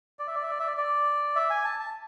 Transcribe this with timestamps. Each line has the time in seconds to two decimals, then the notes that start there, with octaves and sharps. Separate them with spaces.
0.19 D5
0.27 E5
0.35 D5
0.43 E5
0.50 D5
0.60 E5
0.67 D5
0.77 D5
1.36 E5
1.50 G#5
1.65 A5
1.79 A5